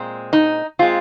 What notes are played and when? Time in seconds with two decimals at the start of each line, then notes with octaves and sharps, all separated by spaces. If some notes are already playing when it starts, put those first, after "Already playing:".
Already playing: A#2 G#3 C4
0.33 D#4
0.79 A#2 G#3 C4 F4